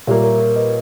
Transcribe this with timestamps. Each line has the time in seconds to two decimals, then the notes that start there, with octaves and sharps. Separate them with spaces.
0.07 A#2 G3 A#3 C#5 E5
0.24 A#4 C#5
0.40 A#4 C#5
0.56 B4 D#5